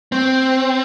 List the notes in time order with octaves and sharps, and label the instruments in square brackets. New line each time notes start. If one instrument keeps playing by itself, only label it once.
[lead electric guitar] C4